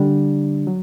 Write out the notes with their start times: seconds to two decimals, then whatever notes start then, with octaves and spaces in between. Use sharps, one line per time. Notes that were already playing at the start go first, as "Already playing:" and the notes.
Already playing: D3 G3 D4
0.67 F#3